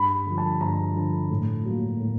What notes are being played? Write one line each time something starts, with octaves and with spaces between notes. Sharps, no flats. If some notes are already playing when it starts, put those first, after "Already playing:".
Already playing: G2 B5
D3 F3
A5
G2 A#5
D3 F3
A2
F#3 A#3
A2